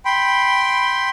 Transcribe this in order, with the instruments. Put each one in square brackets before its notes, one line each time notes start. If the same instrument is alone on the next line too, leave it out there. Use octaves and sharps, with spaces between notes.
[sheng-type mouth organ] G5 B5 C6